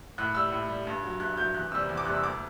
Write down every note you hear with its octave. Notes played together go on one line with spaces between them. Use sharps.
A2 F#6
G3 E6
A2
G3
G2
F#3
G2 F#6
F#3 G6
E2 F#6
C3 G3 E6
E2
D6
C3 G3 F#6
E6
D2 D6